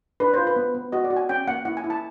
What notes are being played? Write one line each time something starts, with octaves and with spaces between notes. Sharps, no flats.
D4 B4
F4 C5
B4
B3
B3
F#4 D#5
D5
F#4
G#5
C#4 G5
A#3 F#5
E4 F#5
G#5
E4
A5